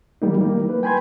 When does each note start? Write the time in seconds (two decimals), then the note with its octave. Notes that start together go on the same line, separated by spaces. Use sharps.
0.22 D#3 F#3 G3 A#3 D#4
0.39 A#3 E4
0.69 B4
0.83 G5 G#5 B5 C6 G#6